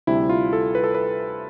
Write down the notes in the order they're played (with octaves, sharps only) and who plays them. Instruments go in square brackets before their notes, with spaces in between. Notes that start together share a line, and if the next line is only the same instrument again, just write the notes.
[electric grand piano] D2 C3 G3 E4
F4
A4
B4
A4
B4